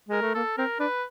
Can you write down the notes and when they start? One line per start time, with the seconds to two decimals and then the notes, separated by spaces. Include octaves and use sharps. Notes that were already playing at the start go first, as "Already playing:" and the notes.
0.08 G#3 A#4
0.22 A3
0.35 A#3 A4
0.58 C4 A#4
0.79 D4 B4